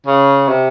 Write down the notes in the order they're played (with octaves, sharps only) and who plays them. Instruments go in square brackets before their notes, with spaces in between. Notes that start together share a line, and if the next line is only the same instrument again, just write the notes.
[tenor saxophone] C#3
C3